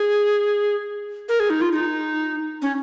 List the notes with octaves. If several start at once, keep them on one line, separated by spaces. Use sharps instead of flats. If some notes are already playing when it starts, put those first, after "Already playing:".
Already playing: G#4
A#4
G#4
D#4
F4
D#4
C#4